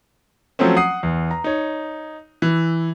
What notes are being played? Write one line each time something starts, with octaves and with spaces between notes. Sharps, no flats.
F3 F#3 A3 C4 C#4
F#5 D#6 C7
E2
A#5
D#4 C#5
E3